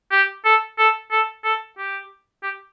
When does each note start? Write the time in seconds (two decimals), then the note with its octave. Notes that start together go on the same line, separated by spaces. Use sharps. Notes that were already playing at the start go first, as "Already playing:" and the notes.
0.11 G4
0.45 A4
0.78 A4
1.11 A4
1.44 A4
1.78 G4
2.43 G4